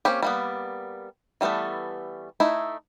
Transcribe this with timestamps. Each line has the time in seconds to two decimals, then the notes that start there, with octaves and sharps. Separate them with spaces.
0.05 A#3 C4 C#4 G4
0.23 G3 A#3 B3
1.41 E3 G3 A3 B3 A4
2.40 A3 D#4 E4